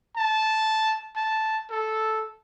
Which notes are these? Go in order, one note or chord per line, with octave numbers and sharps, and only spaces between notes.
A5
A5
A4